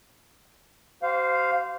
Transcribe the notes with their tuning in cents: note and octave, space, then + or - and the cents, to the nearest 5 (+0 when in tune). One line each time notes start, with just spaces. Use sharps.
F#4 +40 C5 -15 F5 +0